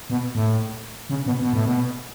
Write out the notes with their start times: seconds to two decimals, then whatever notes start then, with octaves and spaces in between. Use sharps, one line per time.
0.10 B2
0.35 A2
1.10 C#3
1.26 B2
1.41 B2
1.53 A2
1.65 B2